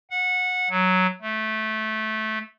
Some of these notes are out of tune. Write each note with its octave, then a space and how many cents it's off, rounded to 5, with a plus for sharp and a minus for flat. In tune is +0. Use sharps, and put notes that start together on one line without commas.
F#5 -20
F#3 +0
A3 -15